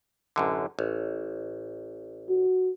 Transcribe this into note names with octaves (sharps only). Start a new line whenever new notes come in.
A1 F#2 D3
A1
F#4